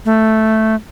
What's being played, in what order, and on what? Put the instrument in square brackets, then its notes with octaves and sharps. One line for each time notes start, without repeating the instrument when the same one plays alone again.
[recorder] A3